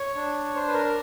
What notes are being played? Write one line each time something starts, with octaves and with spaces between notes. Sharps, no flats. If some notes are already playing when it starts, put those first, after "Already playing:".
Already playing: C#5
D4
D4 C5
B4
A#4